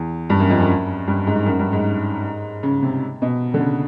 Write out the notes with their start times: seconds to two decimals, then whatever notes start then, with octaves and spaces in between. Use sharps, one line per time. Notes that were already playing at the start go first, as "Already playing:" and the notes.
Already playing: E2
0.30 G2
0.40 F#2
0.50 F2
0.60 F#2
1.07 G2
1.27 G#2
1.46 F#2
1.59 G2
1.72 G#2
2.63 C#3
2.82 C3
3.22 B2
3.54 D3
3.60 C#3